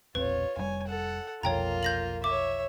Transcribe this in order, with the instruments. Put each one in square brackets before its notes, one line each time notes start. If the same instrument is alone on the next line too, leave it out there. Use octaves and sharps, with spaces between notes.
[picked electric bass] E1 A#1 C4 [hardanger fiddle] F4 C#5 [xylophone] B4
[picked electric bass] F1 C3 G3 [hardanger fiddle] C#5 G#5
[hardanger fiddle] A4 F#5
[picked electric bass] F1 B1 F2 [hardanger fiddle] A#3 F4 [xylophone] C#5 G5 A#5
[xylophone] G6 A#6 F#7
[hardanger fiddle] C#5 E5 [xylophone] D6